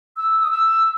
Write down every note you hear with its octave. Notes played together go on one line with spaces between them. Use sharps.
E6
D#6
E6